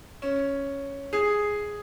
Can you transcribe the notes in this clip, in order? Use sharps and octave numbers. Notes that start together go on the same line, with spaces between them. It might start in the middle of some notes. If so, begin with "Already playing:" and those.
C#4
G#4